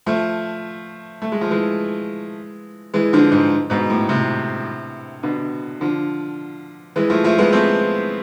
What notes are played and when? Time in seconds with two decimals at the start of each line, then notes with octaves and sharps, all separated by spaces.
0.06 F3 A3
1.22 A3
1.32 G#3
1.41 F3
1.50 E3 G#3
2.94 E3 G#3
3.13 D3 F3
3.32 G#2
3.70 G#2 B2
3.90 A2
4.09 A2 C3
5.23 B2 D3
5.81 D3 F3
6.96 E3 G#3
7.10 F3 A3
7.24 F3 A3
7.38 G#3 B3
7.52 A3 C4